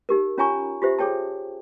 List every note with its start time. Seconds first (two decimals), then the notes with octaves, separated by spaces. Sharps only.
0.09 D#4 G4 A#4
0.38 C#4 F4 C#5 G#5 A#5 C#6
0.82 F4 G4 C5 E5
0.99 G#4 A4 C#5 G5 A5